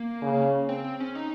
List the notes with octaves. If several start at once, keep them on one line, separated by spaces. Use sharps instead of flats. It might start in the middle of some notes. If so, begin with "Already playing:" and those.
Already playing: A#3
C#3
C4
C4
C#4
D#4